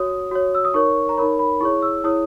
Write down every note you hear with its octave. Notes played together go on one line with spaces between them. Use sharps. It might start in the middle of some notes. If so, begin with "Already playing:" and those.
Already playing: F#4 C#5 D#6
F#4 C#5
E6
D#6
D#4 A#4 C#5 C#6
A#5
D#4 A#4 C#5 B5
B5
E4 G#4 C#5 C#6
E6
E4 G#4 C#5 D#6